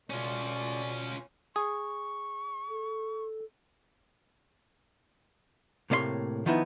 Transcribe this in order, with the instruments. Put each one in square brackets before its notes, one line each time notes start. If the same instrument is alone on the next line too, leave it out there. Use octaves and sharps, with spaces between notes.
[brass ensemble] C#2 A3 D5 [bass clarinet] B2 [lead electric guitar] C#4 F4
[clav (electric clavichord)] G#4 [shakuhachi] C#6
[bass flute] A4
[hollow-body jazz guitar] A2 C3 A#3 C#5 D5 C6
D#3 F3 B3 D#4 E4